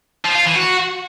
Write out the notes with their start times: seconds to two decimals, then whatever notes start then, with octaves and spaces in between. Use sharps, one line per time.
0.25 F3
0.35 F4
0.45 E3
0.56 F#4